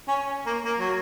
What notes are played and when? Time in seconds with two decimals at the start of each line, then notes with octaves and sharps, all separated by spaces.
0.08 C#4
0.46 A#3
0.65 A#3
0.79 F#3